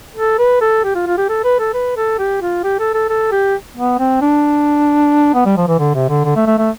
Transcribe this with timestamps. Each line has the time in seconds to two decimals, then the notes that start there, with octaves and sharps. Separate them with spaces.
0.16 A4
0.38 B4
0.61 A4
0.84 G4
0.95 F4
1.06 F4
1.18 G4
1.29 A4
1.44 B4
1.59 A4
1.73 B4
1.96 A4
2.19 G4
2.42 F4
2.64 G4
2.79 A4
2.94 A4
3.09 A4
3.32 G4
3.77 B3
3.99 C4
4.21 D4
5.34 B3
5.46 G3
5.57 F3
5.68 E3
5.79 D3
5.95 C3
6.09 D3
6.24 D3
6.36 A3
6.47 A3
6.58 A3